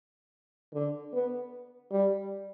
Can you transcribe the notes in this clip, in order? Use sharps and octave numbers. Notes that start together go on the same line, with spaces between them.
D3
B3
G3